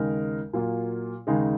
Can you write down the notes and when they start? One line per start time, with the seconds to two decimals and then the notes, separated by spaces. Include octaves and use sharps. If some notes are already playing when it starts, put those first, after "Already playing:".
Already playing: D#2 C#3 G#3 D#4 A#4
0.53 A#2 F#3 A#3 F4
1.27 D#2 C#3 G#3 D#4 G#4